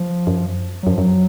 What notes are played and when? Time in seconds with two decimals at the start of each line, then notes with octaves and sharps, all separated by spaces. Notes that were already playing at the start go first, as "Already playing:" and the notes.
Already playing: F3
0.27 F#2
0.83 F#3
0.87 F#2
0.91 F3
0.98 F#2 F#3